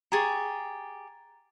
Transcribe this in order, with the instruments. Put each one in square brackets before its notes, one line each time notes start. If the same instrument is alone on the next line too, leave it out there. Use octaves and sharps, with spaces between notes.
[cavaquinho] G4 G#4 C#6 [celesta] A#5 G#6 A6